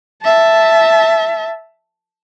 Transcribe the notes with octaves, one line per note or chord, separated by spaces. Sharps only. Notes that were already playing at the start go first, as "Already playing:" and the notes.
E5 A5